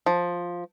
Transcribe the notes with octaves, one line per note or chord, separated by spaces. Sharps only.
F3